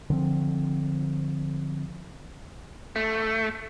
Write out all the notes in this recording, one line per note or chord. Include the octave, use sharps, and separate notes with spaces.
D3 F3 C4
A3